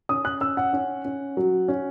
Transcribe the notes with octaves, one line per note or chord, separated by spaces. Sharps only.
C#4 D#6
F#6
C#4 E6
F#5
C#4
C#4
F#3
C#4